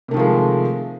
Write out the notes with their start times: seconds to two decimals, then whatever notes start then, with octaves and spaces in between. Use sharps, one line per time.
0.08 C3
0.11 A3
0.14 D#3
0.17 F3
0.19 G#3